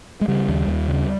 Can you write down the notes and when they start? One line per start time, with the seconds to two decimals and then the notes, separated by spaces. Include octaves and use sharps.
0.21 G#3
0.28 C#3 G3
0.48 D#2
0.68 D#2
0.88 C#3